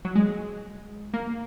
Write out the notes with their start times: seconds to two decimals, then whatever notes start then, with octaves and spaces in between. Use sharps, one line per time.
0.05 F#3
0.15 G#3
1.14 A#3